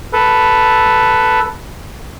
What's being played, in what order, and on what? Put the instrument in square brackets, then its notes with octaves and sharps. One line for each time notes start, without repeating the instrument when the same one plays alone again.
[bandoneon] A4 B4